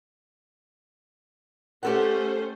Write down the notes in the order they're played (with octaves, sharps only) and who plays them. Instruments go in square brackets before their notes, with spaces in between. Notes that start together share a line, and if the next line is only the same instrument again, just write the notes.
[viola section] A3 C#4 C5 [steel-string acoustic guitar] G4 A4 F#5